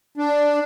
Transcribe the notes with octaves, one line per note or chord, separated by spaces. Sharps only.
D4